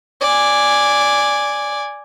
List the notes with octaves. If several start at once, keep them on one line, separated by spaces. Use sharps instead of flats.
D5 G#5